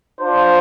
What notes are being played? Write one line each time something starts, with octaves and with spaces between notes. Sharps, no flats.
D4 F4 C5